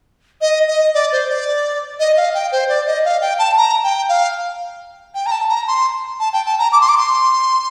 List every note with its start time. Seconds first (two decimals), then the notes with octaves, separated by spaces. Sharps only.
0.41 D#5
0.68 D#5
0.94 D5
1.12 C5
1.30 D5
2.00 D#5
2.17 F5
2.34 G5
2.52 C5
2.69 D5
2.87 D#5
3.05 F5
3.21 G5
3.39 A5
3.58 A#5
3.84 G5
4.09 F5
5.15 G5
5.26 A#5
5.31 A5
5.49 A#5
5.68 C6
6.20 A5
6.33 G5
6.46 A5
6.59 A#5
6.72 D6
6.81 C6
6.89 D6
6.98 C6